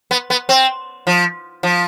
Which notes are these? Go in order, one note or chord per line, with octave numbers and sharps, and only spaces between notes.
B3
B3
C4
F3
F3